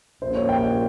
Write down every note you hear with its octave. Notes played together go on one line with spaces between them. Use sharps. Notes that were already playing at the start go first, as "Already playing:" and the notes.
A#1 A#2 G3 A#3 C#4 C5
C#5
G5